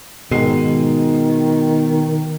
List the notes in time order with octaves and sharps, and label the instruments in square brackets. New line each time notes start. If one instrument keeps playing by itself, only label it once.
[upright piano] G#2 G#3 C7 [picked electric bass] B2 [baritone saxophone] D#3